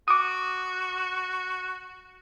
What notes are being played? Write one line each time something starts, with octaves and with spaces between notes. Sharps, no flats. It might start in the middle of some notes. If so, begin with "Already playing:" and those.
F#4 D6 D#6